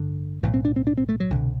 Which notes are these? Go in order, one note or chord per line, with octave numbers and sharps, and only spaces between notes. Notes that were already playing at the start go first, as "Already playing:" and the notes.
Already playing: A1 G2 D3
B1 A2 E3
C4
D4
C4
D4
C4
A3
F#3
C2 B2 D3